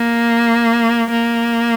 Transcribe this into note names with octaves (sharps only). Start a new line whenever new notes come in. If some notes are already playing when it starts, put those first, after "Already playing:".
Already playing: A#3
A#3